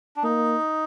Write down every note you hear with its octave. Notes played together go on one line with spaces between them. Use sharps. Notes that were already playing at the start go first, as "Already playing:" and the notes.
D4
A#3 D#4